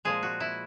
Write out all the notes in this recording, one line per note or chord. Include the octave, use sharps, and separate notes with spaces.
A#2 F3 G#3 G#4
F#4
E4